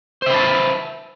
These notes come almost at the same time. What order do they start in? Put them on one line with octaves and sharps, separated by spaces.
C5 E5 B4 A5